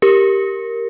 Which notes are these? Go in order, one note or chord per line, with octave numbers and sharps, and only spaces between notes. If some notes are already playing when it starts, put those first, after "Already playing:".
G4 A#4